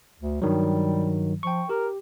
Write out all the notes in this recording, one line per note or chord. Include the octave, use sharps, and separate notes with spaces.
D2
G2 D#3 F#3 G3
F3 G5 C#6
G4 A#4